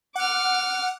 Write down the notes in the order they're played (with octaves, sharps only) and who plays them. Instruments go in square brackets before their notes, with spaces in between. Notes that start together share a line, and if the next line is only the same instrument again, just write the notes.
[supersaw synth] F#5 [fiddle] D6 F6